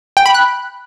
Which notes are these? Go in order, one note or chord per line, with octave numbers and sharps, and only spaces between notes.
G5
B5
F#6